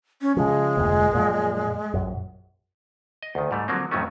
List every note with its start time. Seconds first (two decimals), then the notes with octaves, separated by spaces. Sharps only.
0.21 C#4
0.37 C#3 F3 G#3
0.77 F1 D2 A#2
1.13 F#2 A#2 F3
1.94 A#1 F#2
3.23 D#5
3.35 D2 D#3
3.51 G#2 G3 A3
3.68 D3 F3 F#3 A#3 C4
3.91 F2 A2 D#3 F#3 A3 C#4